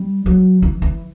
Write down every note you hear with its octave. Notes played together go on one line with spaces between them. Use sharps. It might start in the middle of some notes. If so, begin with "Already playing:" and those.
Already playing: G3
F#3
E3
E3